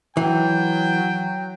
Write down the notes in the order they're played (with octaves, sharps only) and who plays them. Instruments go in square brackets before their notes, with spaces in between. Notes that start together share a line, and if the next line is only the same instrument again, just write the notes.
[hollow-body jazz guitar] E3 [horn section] F#3 G5